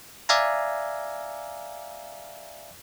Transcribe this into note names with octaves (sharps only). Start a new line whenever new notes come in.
D5 E5 F5 G#5 A#5